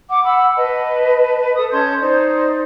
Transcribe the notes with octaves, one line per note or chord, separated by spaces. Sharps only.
F#5 D6
F#5 B5 E6
B4 D#5 A5
A4 D#6
C#4 A5 C6 G6
D#4 C5 D5